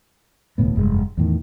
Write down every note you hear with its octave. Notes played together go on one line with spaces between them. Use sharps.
E1 D2 A2 B3
F1 G2 G#3
E2 A2 D#3